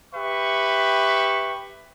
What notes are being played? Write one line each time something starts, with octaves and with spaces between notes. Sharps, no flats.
G4 B4 E5 C#6